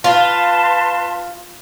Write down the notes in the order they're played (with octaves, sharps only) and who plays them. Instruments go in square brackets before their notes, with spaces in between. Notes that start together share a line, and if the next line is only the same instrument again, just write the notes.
[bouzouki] F4 [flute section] B4 A5 C6